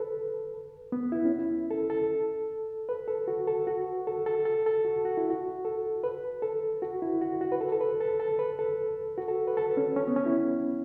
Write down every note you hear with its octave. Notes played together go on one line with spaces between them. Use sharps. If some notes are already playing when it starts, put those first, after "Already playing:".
Already playing: A4 B4
B3
E4
C#4
E4
A4
A4
B4
A4
F#4
A4
F#4
A4
A4
A4
A4
F#4
F#4
E4
F#4
A4
B4
A4
F#4
E4
F#4
F#4
B4
A4
A4
B4
A4
A4
B4
A4
F#4
A4
B4
A4
C#4
C#4
B3
C#4
E4